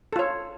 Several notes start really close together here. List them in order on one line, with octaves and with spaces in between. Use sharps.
A4 F4 C#5